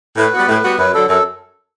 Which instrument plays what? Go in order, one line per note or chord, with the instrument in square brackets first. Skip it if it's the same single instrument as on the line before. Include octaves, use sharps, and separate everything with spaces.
[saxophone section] A2 [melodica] B4
[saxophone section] G3 B3 F#4
A2
G3 B3 F#4
[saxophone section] F#2 [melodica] B4
[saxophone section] D3 F#3 [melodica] A4
[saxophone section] F#2 [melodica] A4